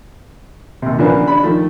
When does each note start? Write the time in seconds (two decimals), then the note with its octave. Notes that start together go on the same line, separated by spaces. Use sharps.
0.82 D#2 C3
0.99 C#3 E3 F3 A#3 B3 D4
1.28 D4 B5
1.43 D#3 F3 A3